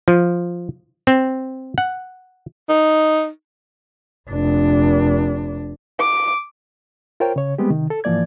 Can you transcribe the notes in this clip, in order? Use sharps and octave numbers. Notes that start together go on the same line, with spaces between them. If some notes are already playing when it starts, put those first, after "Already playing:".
F3
C4
F#5
D#4
F1 D4
D6
F4 A#4 C5 C#5 G5
C#3 C#5
G3 G#3 B3 C4 G4
C3 D#3
A4
G#2 E3 F3 A#3 D5 G#6